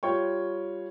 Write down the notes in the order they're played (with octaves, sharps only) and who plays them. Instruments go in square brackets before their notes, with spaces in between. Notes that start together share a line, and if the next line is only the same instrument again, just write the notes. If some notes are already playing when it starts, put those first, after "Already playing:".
[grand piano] G3 F4 C#5 G5 C#6